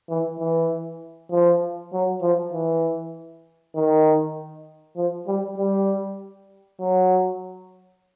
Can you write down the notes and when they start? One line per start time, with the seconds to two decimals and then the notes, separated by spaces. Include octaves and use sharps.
0.09 E3
0.39 E3
1.31 F3
1.93 F#3
2.22 F3
2.54 E3
3.76 D#3
4.97 F3
5.27 G3
5.58 G3
6.80 F#3